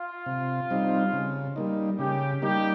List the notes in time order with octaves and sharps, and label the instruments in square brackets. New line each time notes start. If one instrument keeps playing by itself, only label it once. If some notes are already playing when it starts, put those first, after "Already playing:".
Already playing: [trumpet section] F4
[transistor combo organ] C3
G3 C4 D#4
C#3
G3 A#3 D#4
[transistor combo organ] C#3 [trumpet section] G4
[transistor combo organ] G3 A#3 D#4 [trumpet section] G4